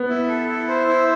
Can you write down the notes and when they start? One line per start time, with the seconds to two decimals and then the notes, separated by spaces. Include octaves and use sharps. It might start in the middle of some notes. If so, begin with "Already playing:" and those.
Already playing: B3
0.09 E4
0.29 A4
0.49 E4
0.68 C5
0.88 E4